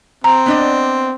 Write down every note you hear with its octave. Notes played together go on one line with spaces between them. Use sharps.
C4 A#5
B3 D4 D#5